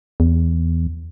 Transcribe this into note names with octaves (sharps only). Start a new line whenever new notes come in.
E2